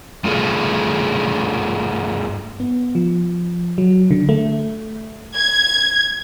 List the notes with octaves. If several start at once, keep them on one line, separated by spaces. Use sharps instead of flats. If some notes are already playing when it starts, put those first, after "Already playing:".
G2 A3 F4 G#4 A4
B3
F3
F#3
D3
A3
G#6